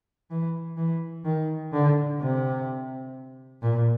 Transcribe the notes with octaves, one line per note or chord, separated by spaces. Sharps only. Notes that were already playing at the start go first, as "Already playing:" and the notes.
E3
E3
D#3
D3
C3
A#2